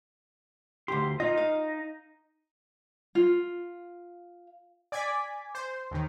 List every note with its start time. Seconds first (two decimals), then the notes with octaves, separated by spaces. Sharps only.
0.88 D2 G4 C6
1.20 D#4 F4 D#5
1.37 F5
3.15 F4
4.92 D5 G#5 D6 G#6 B6
5.55 C5
5.91 D#2 D#3